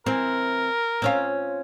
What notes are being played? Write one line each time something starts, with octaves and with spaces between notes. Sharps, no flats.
E3 C4 A#4
C4 C#4 F4